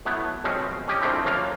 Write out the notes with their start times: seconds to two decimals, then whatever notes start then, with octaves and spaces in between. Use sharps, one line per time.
0.05 F#3 A3 B3 E4
0.44 F#2 B2 F3 G#3 C4 C#4
0.88 C#4 G4 D#5
1.01 F3 G#3 A3 C4 D4 E4
1.25 F#2 F#3 A#3 F4 A#5